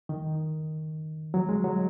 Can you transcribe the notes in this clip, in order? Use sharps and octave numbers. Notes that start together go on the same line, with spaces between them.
D#3
F#3
G#3
F#3